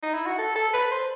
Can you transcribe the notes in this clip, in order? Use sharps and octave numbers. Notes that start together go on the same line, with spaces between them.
D#4
E4
F#4
A4
A4
B4
C5